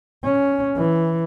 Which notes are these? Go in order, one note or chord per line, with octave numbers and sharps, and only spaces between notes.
C#4
E3